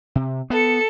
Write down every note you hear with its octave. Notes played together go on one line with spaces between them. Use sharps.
C3
B3 A4 C#7